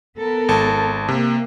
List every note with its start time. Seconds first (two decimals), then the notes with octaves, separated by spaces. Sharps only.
0.18 B3 A4 A#4
0.49 G#1 A5
1.09 C3 A#3